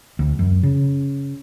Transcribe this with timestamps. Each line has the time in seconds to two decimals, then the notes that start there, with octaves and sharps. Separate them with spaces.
0.19 D2
0.39 F#2
0.63 C#3